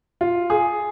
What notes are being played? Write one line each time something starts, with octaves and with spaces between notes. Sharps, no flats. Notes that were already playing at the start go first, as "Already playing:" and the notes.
F4
G#4